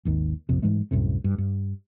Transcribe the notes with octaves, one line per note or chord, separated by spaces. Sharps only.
G#1 D#2 D#3
A#1 F2 C3
G#2 E3 G#3 A3
C2 F#2 A2 C3
G2
G2